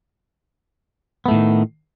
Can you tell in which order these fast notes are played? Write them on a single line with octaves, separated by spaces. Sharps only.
B3 A3 A2 D#3